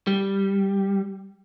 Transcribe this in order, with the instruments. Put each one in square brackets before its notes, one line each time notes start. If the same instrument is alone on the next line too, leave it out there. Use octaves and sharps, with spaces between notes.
[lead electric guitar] G3